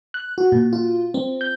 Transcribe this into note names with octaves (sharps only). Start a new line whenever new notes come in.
F#6
F#4
A#2
F4
C4
G6